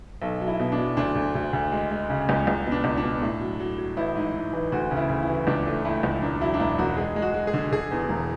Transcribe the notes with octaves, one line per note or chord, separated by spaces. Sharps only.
B1 A4
F#3
E4
B2
D4
F#3
D2 D4
D2
D2
D2
G#3
G#3
C#3
C#2
C#2
B2
D4
C#2
D4
B2
A2
F#3
F#3
F#3
A1 E4
G#2
G#2
E3
D2 F#4
C#3
E4
D2
E4
E3
C#2 D4
A3
A3 E4
C#2
E1 D4
F#3 E4
D4
E1 E4
E1 F#4
G#3 G#4
G#3
F#4
G#3
G#4
D3
D3 G#4
E2
E1